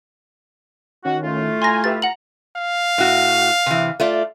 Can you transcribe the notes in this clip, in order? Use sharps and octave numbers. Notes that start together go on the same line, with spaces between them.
D#3 C#4 F#4
A2 A3 F4
G#5 A#5 C6 A#6
G4 B4 E5 A6
F#5 A#5 F#7
F5
A2 F#4
C3 E3
A3 F4 D5